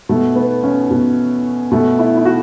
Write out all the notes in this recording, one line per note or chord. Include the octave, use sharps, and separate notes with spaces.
B2 A3
B3
C#4
B2
B2 A3
E4
E4
F#4